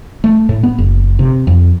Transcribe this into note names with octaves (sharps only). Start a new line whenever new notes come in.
A3
A2
B3
F#1
C3
F2